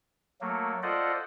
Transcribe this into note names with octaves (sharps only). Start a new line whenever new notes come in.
F#3 A3 A#3
F4 A4 C5 D5 D#5 F#5